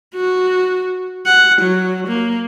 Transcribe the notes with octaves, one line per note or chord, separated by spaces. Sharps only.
F#4
F#5
F#3
A#3